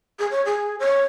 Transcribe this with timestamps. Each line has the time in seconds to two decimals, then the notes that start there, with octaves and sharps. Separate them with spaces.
0.19 G#4
0.31 C#5
0.45 G#4
0.80 C#5